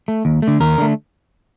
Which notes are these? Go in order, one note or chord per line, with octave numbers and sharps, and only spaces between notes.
A3
D#2
A3
D3
D#2 A#4
D3 A3